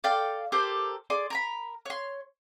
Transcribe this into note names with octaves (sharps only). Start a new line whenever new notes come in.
A4 D5 F5 G5
G4 A4 A#4 C5
G#4 D5 C6
A#4 A#5 B5
C#5 C6